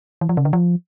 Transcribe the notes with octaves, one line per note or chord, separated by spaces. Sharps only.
E3
F3
C#3
D3
F3